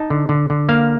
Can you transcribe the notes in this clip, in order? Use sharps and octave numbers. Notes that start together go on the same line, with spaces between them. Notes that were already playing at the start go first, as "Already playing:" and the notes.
Already playing: D#4 A5
D3
D3
D3
A#3 F5